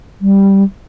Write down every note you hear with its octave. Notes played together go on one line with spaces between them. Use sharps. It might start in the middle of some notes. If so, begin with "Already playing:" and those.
G3